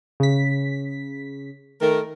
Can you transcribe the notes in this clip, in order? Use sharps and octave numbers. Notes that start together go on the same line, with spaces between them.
C#3 B6
D#3 A3 A#4